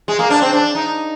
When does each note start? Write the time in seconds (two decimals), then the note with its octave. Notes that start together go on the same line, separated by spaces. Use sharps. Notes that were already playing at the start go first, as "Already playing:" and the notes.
0.08 G#3
0.19 A#3
0.30 D4
0.42 C4
0.53 D4
0.75 D#4